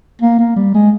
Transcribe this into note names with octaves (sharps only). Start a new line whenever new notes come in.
A#3
A#3
G3
G#3